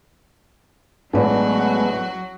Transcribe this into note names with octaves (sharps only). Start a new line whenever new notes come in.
A1 F#3 G#3 A3 B3 F#4 B4 D5